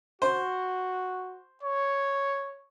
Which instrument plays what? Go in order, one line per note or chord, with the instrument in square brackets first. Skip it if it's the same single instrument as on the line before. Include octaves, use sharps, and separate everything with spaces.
[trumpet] F#4 [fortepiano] C5
[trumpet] C#5